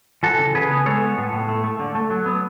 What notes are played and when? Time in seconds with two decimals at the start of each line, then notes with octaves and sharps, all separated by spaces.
0.23 E3 F#4 A4
0.39 C#3
0.55 C#3 G#4 B4
0.71 B3
0.86 G#3 A4 C#5
1.02 B3
1.18 A2
1.32 A2
1.49 A3
1.64 A3
1.79 D3
1.95 A3
2.10 F#3
2.26 B3